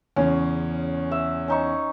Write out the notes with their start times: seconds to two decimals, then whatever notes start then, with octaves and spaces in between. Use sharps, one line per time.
0.16 E2 C#3 C#4
1.11 E5
1.48 C#4 D#4 C#6